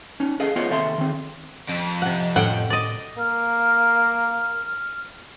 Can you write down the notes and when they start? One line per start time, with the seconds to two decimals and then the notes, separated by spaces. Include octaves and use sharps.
0.20 C#4 D#4
0.40 G#4 A4 D#5 F5
0.56 B3 F4 C5 C#5 D#5 F5
0.70 D#2 C3 A4 E5 A#5 C6
0.98 D#3 C4
1.69 F2
2.02 C3 F#5
2.36 A2 F#5 G5
2.70 D5 D#5
3.19 A#3 F6